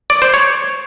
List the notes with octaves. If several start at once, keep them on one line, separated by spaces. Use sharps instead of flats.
D5
C5
C#5